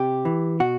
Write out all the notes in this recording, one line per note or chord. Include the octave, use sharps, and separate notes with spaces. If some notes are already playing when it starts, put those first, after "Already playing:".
Already playing: C3 G4
E3
B2 F#4